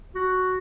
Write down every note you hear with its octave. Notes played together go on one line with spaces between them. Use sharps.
F#4